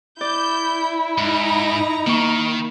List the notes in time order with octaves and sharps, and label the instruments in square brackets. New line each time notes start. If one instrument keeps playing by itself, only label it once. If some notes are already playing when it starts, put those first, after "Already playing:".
[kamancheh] E4 [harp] D5 [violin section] G6
[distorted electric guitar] G#2 [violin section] D#4 A#5
[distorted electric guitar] D#3 [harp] A#3 C#6